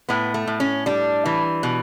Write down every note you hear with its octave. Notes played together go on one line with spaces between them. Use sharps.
A2 B3
A3
A2
C#4
G3 D4
E3
B2